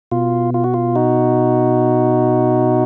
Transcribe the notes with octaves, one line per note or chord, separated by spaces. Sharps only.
B2 F4
F4
F#4
F4
D#4 F#4